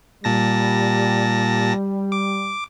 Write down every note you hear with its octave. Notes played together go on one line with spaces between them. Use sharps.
A#2 G3 A5 A#6
D6